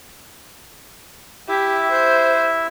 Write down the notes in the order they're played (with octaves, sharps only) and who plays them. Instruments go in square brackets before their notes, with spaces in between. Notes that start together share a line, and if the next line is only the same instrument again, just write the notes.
[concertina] E4 E5 [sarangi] G4
[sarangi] C5